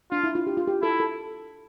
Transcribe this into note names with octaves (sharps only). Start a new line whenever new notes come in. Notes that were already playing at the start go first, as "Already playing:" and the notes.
D4 F4
E4
F4
G4
F4
G4
E4 A4
A4